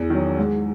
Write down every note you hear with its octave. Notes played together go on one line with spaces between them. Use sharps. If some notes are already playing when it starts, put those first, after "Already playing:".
Already playing: E2
D#3 F#3
G#2